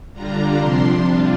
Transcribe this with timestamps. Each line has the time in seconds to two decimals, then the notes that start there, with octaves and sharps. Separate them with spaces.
0.13 D3 G3 D4 F4 A#5
0.58 C3 F3 D4 C6
1.02 C3 G3 D4 F4